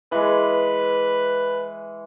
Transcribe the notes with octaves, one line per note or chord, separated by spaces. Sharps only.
E3 G#3 B4